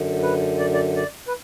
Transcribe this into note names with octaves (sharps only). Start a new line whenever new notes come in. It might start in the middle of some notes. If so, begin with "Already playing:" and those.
Already playing: F#2 D3
B4
D5
D5
D5
B4